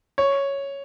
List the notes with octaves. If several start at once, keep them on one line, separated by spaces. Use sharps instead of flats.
C#5